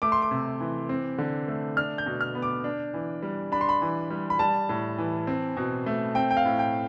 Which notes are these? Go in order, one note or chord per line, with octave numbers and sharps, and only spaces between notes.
A3 D6
C6
D6
C3
E3
C4
D3
A3
D4 F6
G6
B2
F6
B3
D6
D4
E3
G3
D4 B5
C6
B5
E3
G3
B5
G3 A5
A2
E3
C4
B2
A3
C4 G5
G5
F5
A2
G5